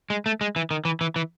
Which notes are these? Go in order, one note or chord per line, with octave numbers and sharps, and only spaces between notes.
G#3
A3
G#3
E3
D#3
E3
E3
E3